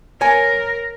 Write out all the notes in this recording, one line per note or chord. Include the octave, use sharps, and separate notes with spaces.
A#4 C#5 G#5